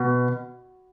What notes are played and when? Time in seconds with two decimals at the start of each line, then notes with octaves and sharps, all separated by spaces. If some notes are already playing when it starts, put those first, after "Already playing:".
Already playing: B2